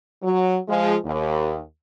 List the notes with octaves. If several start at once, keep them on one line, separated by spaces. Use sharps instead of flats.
F#3
F3 G#3
D#2